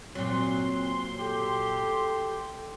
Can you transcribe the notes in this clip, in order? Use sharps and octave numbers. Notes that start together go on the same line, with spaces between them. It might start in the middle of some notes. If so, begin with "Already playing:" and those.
A#2 F#3 C4 C6
G4 A4